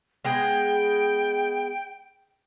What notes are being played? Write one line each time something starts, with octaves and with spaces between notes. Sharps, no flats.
G#3 B3 G#4 G5